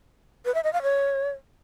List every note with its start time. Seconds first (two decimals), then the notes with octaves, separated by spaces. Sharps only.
0.45 B4
0.55 E5
0.64 D#5
0.73 F5
0.82 C#5